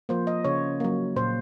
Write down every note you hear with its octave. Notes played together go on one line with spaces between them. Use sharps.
F3 A#3 C5
D#5
C#3 C#5
F#3 A#3
A#2 C5